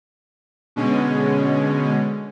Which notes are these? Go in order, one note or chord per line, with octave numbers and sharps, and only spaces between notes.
B2 D3 G#3 C#4